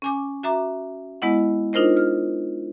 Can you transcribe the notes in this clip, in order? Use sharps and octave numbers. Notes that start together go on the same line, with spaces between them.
C#4 G#5 D6
F#4 E5 A#5 D6
G#3 B3 E4 D#5 F#5
D4 D#4 F4 A#4 C5 D#5
F6